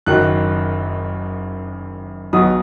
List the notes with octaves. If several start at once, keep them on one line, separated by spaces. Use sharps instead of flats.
F#1 F#2 D#3 F#3 F#6
B1 B2 F#3 D#6